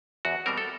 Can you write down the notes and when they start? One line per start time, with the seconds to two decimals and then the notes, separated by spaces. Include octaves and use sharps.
0.25 E2 F#4
0.46 B2 G3 C4 A#4
0.58 A4